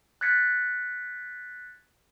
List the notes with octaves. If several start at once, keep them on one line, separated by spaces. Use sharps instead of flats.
F#6 G#6 A6 B6 C#7